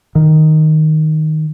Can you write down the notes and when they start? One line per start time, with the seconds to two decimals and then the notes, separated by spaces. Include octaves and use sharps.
0.15 D#3